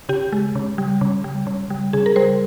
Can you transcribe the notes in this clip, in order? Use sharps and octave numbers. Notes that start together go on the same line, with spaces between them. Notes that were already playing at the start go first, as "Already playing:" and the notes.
C#3 G4
G#3
C#3
G3
C#3
G3
C#3
G3
C#3 G#4
A#4
G3 C5